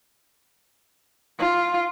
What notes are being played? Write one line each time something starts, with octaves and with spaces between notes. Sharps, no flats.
F4